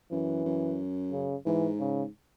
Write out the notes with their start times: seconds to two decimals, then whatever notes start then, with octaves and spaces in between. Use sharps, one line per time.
0.11 F#2 E3
0.45 F#2
1.12 C#3
1.46 G#2 E3
1.80 C#3